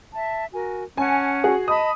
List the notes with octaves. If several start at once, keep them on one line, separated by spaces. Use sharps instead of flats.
E5 A5
F#4 A#4 G#5
C#4 F#5 G#5 A5
F#4 G#4
D#5 A5 B5 D#6